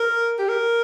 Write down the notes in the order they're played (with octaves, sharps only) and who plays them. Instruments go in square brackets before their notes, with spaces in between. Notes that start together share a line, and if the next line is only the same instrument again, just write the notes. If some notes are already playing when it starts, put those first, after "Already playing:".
Already playing: [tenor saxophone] A#4
G4
A#4